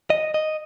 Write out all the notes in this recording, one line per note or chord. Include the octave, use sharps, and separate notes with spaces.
D#5
D#5